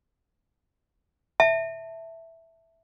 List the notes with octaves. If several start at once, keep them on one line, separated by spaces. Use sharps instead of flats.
E5 A5